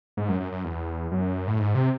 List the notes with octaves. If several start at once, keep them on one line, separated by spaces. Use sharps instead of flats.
G#2
F#2
F#2
F#2
E2
F#2
A2
G#2
C3